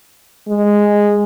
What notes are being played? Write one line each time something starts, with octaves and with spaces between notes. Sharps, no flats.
G#3